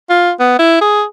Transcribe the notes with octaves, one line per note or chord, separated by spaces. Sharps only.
F4
B3
E4
G#4